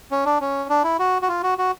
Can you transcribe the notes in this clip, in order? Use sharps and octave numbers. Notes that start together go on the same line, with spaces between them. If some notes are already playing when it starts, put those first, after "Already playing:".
C#4
D4
C#4
D4
E4
F#4
F#4
F4
F#4
F#4